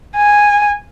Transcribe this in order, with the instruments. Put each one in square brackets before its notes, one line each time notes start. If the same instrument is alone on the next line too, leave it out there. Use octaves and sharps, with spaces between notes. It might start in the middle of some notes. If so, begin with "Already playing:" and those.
[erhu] G#5